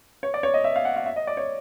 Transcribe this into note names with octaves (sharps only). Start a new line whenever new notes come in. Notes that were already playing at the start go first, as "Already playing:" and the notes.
C#5
D5
C#5
D#5
E5
F5
F#5
F5
E5
D#5
D5
C#5